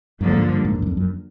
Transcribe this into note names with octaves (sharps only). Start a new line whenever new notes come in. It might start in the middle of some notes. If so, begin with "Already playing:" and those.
G2 D3 F3 A#3
G#2
G2
G#2
G2
F#2
F2
F#2